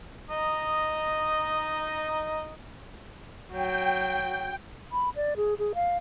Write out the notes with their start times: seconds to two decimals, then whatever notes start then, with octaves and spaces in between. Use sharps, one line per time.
0.30 D#4 D#5
3.52 F#3 G5
4.92 B5
5.16 D5
5.37 G#4
5.59 G#4
5.75 F5